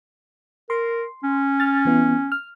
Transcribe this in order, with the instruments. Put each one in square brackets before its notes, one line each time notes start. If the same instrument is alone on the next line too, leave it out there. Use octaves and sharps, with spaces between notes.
[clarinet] A#4 [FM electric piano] C6
[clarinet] C#4
[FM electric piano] F6 A6
E3 B3 E4
F6